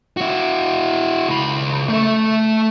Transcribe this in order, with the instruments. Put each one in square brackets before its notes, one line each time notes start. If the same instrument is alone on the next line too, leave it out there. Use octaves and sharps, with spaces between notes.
[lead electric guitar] E4 F#4
C#2 B5
A3 A4